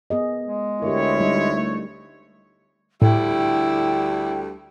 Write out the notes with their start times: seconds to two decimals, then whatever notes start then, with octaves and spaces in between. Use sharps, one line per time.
0.10 B3 G#4 D#5
0.45 G#3
0.82 D2 E4 G4 A#4 C#5
1.21 G3 D#4
1.56 A3
3.02 D2 A2 D3 G3 E4 G5